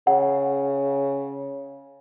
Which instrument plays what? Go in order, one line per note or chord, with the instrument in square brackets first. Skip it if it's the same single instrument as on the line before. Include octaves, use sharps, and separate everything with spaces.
[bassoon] C#3 [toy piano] F#5